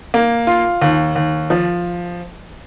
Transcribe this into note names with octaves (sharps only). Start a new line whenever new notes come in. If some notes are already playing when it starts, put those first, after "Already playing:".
A#3
F4
D#2
D#2
F3